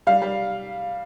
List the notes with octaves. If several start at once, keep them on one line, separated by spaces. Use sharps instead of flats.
G3 F5
G3